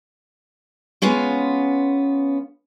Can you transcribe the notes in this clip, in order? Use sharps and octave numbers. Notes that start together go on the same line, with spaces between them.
G#3 B3 C#4 F4